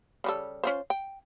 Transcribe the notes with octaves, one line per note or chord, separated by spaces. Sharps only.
C#3 G3 A4
C#4 F4 C5
G5